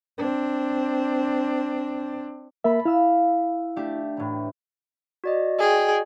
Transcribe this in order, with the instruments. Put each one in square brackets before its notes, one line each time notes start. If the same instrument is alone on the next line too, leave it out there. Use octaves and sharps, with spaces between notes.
[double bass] C4 D4
[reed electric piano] A#3 A#4 E5 [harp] A4 B5
[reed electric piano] E4 [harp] F5 E6
[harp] A3 D4 G4
A1 A2
[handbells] F#4 D5 D#5
[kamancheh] G#4 G5